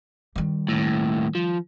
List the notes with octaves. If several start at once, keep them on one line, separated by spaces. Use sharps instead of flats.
D#3 G3
D#2 A2
F3